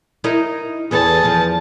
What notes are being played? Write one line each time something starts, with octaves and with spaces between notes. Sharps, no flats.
D#4 E4 A#4
E2 E3 G#4 A4 A5
E2 F3